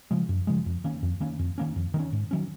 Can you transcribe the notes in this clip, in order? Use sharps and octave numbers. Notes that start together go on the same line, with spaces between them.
C#3 F3 G#3
F#2
C#3 F3 G#3
F2
D#3 A#3 C#4
F2
D#3 A#3 C#4
F2
D#3 A#3 C#4
F2
D#3 A#3 C#4
G#2
D#3 F#3 C#4